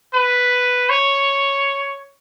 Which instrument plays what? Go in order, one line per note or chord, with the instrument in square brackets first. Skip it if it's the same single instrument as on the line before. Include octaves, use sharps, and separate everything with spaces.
[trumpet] B4
C#5